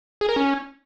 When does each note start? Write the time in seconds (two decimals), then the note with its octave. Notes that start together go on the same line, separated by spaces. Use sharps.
0.21 G#4
0.29 A#4
0.36 C#4